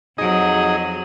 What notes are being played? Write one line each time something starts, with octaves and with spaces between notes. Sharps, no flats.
F2 F#3 D#4 G#4 D#5